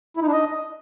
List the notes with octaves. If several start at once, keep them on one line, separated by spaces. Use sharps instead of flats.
E4
D#4
D4
D#5